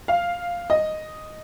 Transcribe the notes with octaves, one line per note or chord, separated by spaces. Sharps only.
F5
D#5